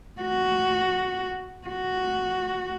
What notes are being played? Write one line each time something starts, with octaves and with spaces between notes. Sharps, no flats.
F#4
F#4